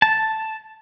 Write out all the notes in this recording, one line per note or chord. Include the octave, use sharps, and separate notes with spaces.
A5